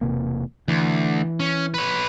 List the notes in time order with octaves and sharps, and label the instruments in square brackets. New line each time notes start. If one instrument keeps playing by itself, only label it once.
[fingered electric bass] E1 C3 A#3
[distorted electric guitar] D2 [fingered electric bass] E3
[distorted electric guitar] C#4
B4 C#5